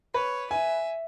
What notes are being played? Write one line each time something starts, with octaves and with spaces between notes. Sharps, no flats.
B4 C#5
E5 G#5